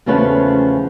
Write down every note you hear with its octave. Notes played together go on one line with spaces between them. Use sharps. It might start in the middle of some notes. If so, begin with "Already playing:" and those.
E2 C#3 F3 A3 C#4 B4